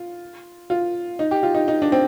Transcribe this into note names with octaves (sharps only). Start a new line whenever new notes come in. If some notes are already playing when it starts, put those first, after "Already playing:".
Already playing: F4
F4
D#4
G4
F4
D#4
D#4
D4
C4